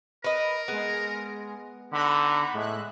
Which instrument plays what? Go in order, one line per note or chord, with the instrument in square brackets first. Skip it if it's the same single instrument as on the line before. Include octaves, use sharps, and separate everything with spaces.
[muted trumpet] A#4 [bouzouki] B4 D#5
[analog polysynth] G#3 G#4 [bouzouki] B3
[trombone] D3 [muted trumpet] D#4 [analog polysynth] F#5 A#5 B5
[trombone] A2 [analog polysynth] G#3 E5 F#6